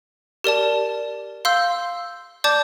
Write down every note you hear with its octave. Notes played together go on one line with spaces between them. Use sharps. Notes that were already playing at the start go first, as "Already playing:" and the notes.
G4 A#4 D5 A5
F5 C6 E6 G6
D5 A5 D6 G6